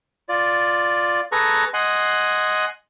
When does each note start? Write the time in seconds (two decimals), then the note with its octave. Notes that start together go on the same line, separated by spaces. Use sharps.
0.29 F4 D5
1.32 G#4 A4 B4 A#5 C#6
1.74 D#5 F#5 G#5 C6